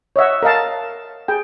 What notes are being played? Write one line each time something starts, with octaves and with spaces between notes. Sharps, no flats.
C#5 D#5 E5 F#5
A#4 D#5 F5 A5
G#4 G5